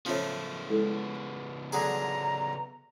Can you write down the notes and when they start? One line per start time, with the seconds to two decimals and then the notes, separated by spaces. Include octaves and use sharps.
0.06 C#3 F3 A3 B3 C#4 F4 C#5
0.69 G#3 E4 A4
1.73 D3 F#3 G#4 A#5